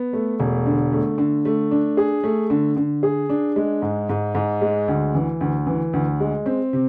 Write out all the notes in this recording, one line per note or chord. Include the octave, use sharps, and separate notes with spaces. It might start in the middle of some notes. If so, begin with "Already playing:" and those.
Already playing: B3
A3
E1
D3
A3
D3
A3
D4
G#4
A3
D3
D3
G#4
D4
G#3
G#2
G#2
G#2
G#3
D2
E3
D2
E3
D2
G#3
C4
C3